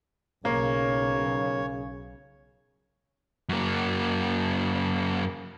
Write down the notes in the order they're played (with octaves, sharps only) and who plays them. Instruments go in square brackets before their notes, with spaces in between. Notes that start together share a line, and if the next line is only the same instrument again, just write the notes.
[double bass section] B1 [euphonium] C#3 [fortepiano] A#3 [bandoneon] C#5
[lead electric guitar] F#2 A#3